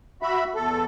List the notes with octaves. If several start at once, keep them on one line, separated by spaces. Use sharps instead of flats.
F#4 E5 B5
E2 A4